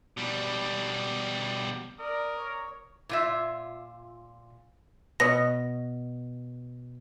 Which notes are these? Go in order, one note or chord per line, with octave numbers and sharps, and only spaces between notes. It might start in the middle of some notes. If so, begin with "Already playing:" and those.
B2 G3
A#4 D5 D#6
C#5
A#2 F4 E5
B2 B4 C#5 D#5 A#6